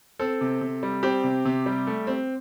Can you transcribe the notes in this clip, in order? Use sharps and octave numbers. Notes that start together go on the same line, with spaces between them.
C4 A4
C3
C3
G3
C4 G4
C3
C3
G3
A3
C4